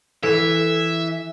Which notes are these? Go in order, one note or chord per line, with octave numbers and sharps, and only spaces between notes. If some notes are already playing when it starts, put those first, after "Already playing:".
E3 A4 E5